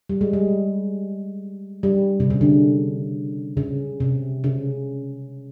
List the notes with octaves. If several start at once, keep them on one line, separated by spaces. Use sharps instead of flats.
G3
G#3
G3
G3
C3
C#3
D3
C#3
C3
C#3